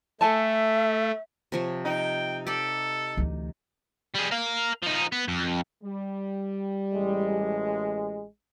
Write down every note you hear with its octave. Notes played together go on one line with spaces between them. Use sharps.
A3 A4 E5 G#5 A5
C3 F3 C#5
D#4 G5
G4 A4 D5
D2 E3
G3 G#4
A#4 F5
F3 D#4
B3
F2
G3
A1 G#3